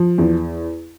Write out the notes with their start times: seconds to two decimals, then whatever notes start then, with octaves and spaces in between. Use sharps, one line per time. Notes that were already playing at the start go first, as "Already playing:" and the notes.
Already playing: F3
0.18 E2